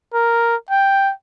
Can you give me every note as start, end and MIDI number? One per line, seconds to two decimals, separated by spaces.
0.14 0.56 70
0.70 1.12 79